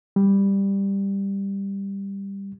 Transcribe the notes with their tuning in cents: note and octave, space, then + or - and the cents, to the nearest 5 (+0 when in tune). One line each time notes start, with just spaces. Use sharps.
G3 +10